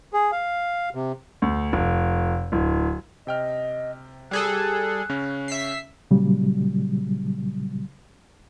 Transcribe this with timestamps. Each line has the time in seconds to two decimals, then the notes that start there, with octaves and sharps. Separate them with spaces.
0.13 G#4
0.32 F5
0.95 C3
1.42 D2
1.73 F1
2.52 D1
3.27 C3 D#5 G5 F6
4.31 G3 G#4 A4 F#6
5.09 C#3 C#4
5.48 E5 B6 C7
6.11 A#2 C#3 F#3 G3